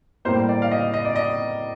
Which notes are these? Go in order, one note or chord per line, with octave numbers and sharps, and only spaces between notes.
A2 G3 A#3 C5
D5
F5
D#5
D#5
D5
D#5